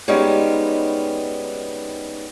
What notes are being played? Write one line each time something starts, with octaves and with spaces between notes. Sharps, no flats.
G3 G#3 B3 C#4 D#4 F5